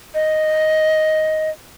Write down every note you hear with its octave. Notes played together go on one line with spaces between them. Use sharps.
D#5